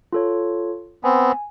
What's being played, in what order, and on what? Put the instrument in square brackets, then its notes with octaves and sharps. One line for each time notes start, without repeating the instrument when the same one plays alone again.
[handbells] F4 A4 C#5
[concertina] B3 C4 [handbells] G#5